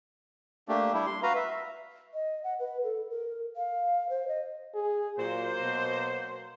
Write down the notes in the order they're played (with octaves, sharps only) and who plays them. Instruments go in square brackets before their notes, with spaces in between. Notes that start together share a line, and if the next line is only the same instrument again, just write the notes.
[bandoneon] A3 A#3 D4 G4
G3 D4 E4
C6
F#4 B4 F5 A#5
E5
[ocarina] D#5
F#5
B4
A4
A#4
F5
C5
D#5
[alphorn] G#4
[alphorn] A#2 [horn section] F#3 A#3 C5
[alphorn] B2